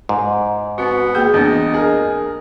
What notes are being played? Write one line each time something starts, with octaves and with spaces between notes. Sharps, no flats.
G#2
B3 C4 F#4
A#3 G#4 G5 G6
E2 C4 D4 D#5
G#4 A#4